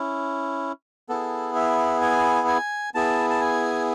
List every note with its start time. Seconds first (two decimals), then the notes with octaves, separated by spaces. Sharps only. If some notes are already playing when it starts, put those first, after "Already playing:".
Already playing: C#4 E4
1.09 B3 E4 G#4 A4
1.55 E5
2.02 G#5
2.48 G#5
2.95 B3 E4 G#4 A5
3.30 A5
3.41 G#5